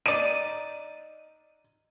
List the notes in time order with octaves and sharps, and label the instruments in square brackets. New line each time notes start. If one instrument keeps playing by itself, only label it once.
[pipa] D#4 D5 [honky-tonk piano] D#7